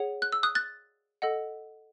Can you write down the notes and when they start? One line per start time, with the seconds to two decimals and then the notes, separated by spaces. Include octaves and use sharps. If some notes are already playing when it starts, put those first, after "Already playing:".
Already playing: G#4 C#5 F#5
0.22 F#6
0.32 E6
0.43 D#6 F#6
0.55 F#6 A6
1.22 A4 D#5 F#5